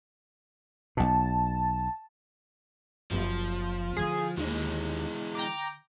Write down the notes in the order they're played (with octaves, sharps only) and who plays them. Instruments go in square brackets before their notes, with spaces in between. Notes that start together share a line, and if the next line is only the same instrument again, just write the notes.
[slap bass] B1 B2 [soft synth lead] A5
[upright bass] F#1 [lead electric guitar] F3
[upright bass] D3 E4 [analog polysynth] G#4
[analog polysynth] D#2 [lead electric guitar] E3 G#3
[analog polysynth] G5 A#5 D6